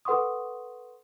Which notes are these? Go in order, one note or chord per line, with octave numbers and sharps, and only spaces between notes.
A4 B4 F#5 C6 C#6 D#6